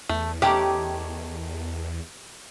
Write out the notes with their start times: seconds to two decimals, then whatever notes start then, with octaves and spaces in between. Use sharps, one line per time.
0.09 E2 A3
0.42 D#3 A3 C#4 G4